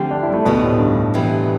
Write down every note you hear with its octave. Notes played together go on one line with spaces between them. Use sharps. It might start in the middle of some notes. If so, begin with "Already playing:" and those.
Already playing: D3 F3 A3 C4 G4
D4
E4
G3
A3
D2 B2 D3 G3 B3
A2
G2
C3 E3 G3 B3